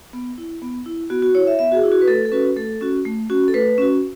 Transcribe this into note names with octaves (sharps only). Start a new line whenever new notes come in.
B3
E4
B3
E4
B3 F#4
F#4
E4 C#5
E5
B3 E5
F#4
G#4
E4
F#4
B4
A3 A4
A4
C#4 F#4 B4
A3 A4
C#4 F#4
A3
C#4 F#4
A4
A3 B4
C#4 F#4